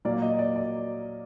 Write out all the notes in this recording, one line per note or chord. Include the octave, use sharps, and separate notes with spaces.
A#2 F#3 A#3 D5
D#5
D5
D5